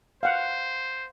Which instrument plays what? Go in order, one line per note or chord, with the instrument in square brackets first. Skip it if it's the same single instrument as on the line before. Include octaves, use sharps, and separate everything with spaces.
[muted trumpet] C5 [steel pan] F5 F#5